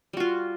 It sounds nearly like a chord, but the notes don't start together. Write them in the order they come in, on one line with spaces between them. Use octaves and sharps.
G3 F#4 F4